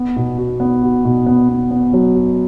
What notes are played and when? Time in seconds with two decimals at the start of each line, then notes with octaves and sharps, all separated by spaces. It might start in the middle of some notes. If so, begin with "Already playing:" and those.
Already playing: B3
0.16 B2
0.38 F#4
0.60 B3
0.83 F#4
1.05 B2
1.26 B3
1.49 B3
1.71 B3
1.93 F#3
2.15 F#4